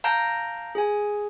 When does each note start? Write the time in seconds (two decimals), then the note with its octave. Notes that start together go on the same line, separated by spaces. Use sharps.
0.04 F5 A5 A#5 G6 A#6 D7
0.75 G#4 G#5